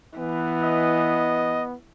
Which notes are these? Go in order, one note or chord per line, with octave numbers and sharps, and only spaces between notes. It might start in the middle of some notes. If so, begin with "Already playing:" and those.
E3 B3
D#5